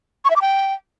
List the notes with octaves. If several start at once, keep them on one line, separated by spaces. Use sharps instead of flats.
C#6
E5
D6
G5